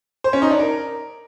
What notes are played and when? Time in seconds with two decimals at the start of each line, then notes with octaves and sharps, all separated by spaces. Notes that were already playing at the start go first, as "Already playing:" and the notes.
0.24 C5
0.33 C#4
0.42 D#4
0.51 D4
0.59 A#4